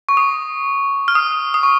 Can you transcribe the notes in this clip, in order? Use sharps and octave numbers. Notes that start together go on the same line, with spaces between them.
C#6
D#6
F6
D#6
D#6
C#6